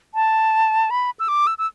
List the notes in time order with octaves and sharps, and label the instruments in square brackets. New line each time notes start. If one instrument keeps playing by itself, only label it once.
[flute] A5
B5
E6
D6
E6
E6